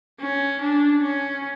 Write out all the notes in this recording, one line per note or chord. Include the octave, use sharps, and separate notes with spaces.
C#4
D4
C#4